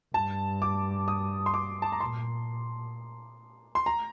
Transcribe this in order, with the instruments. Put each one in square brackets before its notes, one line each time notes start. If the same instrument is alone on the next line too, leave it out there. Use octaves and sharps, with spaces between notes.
[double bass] G2 [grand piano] A5
[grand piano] D6
D#6
C6
D6
A5
A#5
[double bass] A#2 [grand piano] C6
[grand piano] C6
A#5